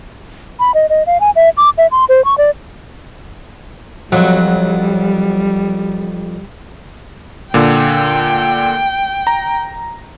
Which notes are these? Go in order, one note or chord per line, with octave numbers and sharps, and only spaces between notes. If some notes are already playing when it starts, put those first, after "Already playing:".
B5
D#5
D#5
F5
G#5
E5
D6
E5
C6
C5
C#6
D5
F2 F#3 G3
A#2 D3 G5
A#5